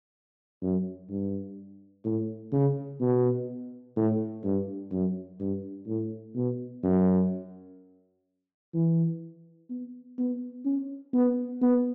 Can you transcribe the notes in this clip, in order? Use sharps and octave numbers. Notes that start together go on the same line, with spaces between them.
F#2
G2
A2
C#3
B2
A2
G2
F#2
G2
A2
B2
F#2
E3
B3
B3
C#4
B3
B3